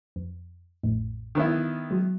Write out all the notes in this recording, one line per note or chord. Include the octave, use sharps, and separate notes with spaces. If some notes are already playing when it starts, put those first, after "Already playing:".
F2
A1 F2 A2
D#3 B3 E4
F#3 G#3